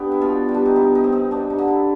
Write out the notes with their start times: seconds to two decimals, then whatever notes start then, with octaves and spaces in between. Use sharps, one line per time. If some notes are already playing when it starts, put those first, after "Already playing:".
Already playing: B3 D4 G4
0.12 E4
0.21 B2 F4
0.49 G3
0.54 D4
0.66 D#4
0.76 B2 E4
0.95 D#4
1.04 C4
1.12 D#4
1.31 G2 D4
1.50 D#4
1.59 D3
1.68 E4